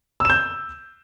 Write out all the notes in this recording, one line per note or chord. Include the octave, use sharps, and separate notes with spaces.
E6 G6 E7